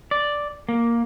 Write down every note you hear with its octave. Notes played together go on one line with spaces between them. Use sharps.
D5
A#3